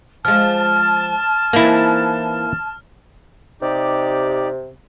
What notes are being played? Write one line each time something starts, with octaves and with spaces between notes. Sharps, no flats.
F3 G#3 A5 F6
E3 A#3 C4 D#4 E4
C3 D#4 G4 D5